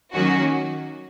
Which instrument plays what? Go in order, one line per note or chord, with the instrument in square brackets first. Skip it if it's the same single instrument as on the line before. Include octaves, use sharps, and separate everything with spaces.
[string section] D#3 F#3 A#3 C#4 F#4